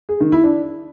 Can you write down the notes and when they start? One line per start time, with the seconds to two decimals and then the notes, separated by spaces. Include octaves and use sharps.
0.09 G#4
0.20 D#3
0.32 E4
0.44 D4